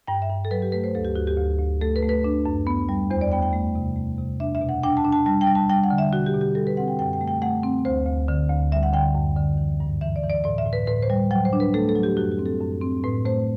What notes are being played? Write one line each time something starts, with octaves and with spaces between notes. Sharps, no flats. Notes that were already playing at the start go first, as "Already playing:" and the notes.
G2 G5
E5
G2
A4
F#3 B4
G4
A3 B4
C5
D2 A4
G4
D2 F#4
G4
D2
D2
A3 A4
B4
A3
B4
D4
F#2
B3
G3
E2 C5
D5
B3 G5
G5
A3
C3
A3
C3
D4 E5
E5
B2
F#5
D4 G5
A5
D4
A5
G3 A5
G5
G3
A5
G3 G5
F#5
D3
E5
B2 F#4
G4
B2
G4
G3 A4
B4
C4 F#5
G5
F#2 G5
G5
A3
G5
A3 F#5
C4
D2 C5
D2
D3
D2
G3 E5
F#5
D3 G5
F#2
D3
E3
G2
E3 E5
D5
E3
D5
A2 D5
E5
A2
B4
A2 B4
C5
G3
F#3 G5
C5
D4
B4
A3 A4
A4
F#3
G4
F#2 F#4
G4
C4
A4
F#2
C4
A2 B4
A3 C5